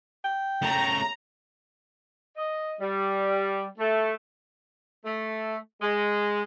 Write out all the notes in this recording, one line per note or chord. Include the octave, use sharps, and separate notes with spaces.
G5
C#3 A3 A#5
D#5
G3
A3
A3
G#3